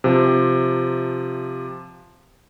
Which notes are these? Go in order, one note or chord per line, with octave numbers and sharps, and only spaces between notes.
C3 F3